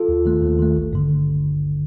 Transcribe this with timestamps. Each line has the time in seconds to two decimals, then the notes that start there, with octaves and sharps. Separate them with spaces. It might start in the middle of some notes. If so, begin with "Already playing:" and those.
Already playing: F4 A4
0.09 D#2
0.25 D#3 A3
0.42 D#2
0.59 D#3 A3
0.76 A1
0.93 G2 D3